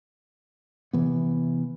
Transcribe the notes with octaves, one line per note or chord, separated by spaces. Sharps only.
C3 E3 B3